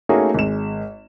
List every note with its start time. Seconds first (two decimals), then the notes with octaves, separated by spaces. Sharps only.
0.09 A3 A#3 C#4 D#4 F#4 G#4
0.34 G#1 G#3 E7